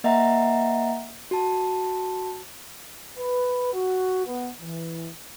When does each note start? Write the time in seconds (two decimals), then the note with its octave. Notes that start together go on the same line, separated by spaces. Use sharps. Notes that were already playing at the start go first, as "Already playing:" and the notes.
0.04 A#3 D#5 E5 F#5 A#5
1.31 F#4 A5
3.17 B4
3.73 F#4
4.26 B3
4.61 E3